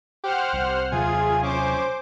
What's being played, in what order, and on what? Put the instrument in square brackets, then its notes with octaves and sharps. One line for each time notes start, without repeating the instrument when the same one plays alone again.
[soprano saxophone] G4 [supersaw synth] C5 F#5 F6
[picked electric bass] C2
[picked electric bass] D#2 C3 F#3 [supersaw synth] F4 G#4 [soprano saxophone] G#5
[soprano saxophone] C#4 [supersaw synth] C5 D6